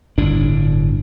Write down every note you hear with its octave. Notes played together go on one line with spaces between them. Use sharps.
G1 A2 D4